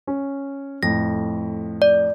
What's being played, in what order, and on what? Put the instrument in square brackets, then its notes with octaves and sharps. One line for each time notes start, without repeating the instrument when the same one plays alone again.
[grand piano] C#4
[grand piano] F2 A2 [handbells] A#6
[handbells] D5